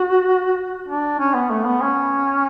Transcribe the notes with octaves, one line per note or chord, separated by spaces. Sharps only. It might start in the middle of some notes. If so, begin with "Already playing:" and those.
Already playing: F#4
D4
C#4
B3
A3
B3
C#4